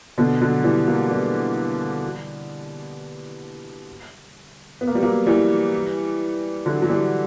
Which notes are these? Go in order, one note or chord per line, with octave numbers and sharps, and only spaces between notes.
B2 D3
D3 F#3
E3 G3
F#3 A#3
G3 B3
B3
A#3
G3
F#3 A#3
E3 G3
D3 F#3
F#3
E3 G3